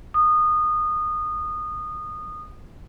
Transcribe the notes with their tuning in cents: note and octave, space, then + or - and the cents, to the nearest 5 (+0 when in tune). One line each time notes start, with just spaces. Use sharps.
D#6 -20